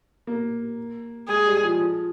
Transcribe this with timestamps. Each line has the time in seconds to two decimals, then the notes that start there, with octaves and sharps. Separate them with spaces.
0.27 A#3
1.28 G#3 G#4
1.46 G3
1.63 F3
1.79 F3